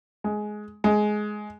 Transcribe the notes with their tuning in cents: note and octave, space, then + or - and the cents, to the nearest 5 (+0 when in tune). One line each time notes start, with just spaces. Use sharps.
G#3 +15
G#3 +15